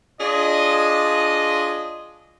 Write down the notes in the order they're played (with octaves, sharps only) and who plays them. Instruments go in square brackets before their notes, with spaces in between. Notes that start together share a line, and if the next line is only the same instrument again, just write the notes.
[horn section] D4 F4 G#4 D#5